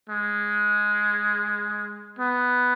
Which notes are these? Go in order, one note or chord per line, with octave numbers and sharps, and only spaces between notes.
G#3
B3